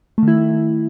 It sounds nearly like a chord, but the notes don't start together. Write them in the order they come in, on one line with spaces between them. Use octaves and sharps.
A3 D#3 E4